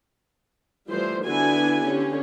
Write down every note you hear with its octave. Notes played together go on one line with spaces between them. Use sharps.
E3 F3 G3 A3 C5
D3 B3 D4 E4 F#4 G#5
D3 C#4 G4